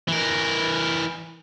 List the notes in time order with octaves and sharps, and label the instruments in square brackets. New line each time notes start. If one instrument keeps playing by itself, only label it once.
[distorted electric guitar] E3 A#4